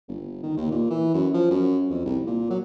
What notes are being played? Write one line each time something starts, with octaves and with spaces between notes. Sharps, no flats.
G1
D#3
D#2
A#2
E3
F#2
F3
F#2
F2
C2
A#2
F#3